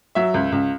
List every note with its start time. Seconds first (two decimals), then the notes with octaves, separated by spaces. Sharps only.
0.15 F#3 E5
0.34 C#2
0.52 C#2